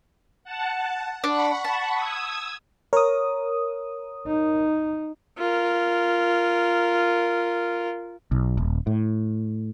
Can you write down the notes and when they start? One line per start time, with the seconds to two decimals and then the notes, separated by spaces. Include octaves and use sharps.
0.44 F#5 A5
1.24 D4 F#5 B5 C#6
1.65 A5
1.95 D#6 E6 G#6
2.93 A#4 C#5 D#6
4.27 D#4
5.38 F4 A#4
8.31 B1
8.57 D#1
8.87 A2